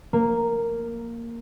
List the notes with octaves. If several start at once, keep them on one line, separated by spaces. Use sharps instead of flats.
A#3